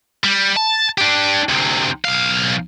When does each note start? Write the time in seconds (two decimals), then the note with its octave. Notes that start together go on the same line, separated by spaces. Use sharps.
0.24 G3
0.56 A5
0.98 D4 G4
1.49 D2 C3
2.05 B1 F5